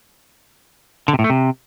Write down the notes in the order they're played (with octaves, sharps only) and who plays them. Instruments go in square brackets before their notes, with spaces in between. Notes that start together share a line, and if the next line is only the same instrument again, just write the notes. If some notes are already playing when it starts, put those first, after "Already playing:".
[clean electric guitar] D3
C3
A2
A3
C3